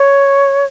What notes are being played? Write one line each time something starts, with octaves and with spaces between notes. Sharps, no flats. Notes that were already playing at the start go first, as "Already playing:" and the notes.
Already playing: C#5